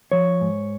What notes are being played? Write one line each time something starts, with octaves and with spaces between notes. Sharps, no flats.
F3 C#5
G#2